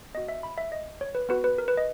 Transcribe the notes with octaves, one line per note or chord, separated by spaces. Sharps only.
B3 F#4 D#5
E5
B5
E5
D#5
C#5
B4
B3 F#4 B4
B4
A#4
B4
D#5